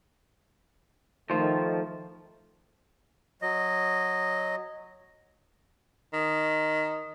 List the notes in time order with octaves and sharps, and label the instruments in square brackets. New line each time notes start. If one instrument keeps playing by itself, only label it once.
[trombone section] D#3 A3 [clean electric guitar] F3 C5
[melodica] F#3 D#5
[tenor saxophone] D#3